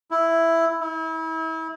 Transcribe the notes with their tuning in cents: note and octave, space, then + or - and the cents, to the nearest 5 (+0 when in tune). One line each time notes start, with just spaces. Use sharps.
E4 +5
E4 -35